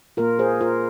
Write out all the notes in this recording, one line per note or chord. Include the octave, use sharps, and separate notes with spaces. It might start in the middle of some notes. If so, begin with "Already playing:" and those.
A#2 A#3 F4 A#4
G#4 C5
F4 A#4